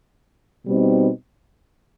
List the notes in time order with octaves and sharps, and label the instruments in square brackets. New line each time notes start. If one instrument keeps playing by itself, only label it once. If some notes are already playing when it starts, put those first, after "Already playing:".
[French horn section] B2 G3 C4 D#4